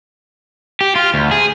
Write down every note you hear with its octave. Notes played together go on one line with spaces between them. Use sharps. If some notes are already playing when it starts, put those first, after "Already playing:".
G4
F4
D2
G#4